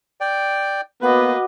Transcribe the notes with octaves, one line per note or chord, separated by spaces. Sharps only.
D5 G5
A#3 B3 F#4 B4 D#5 F#5 D6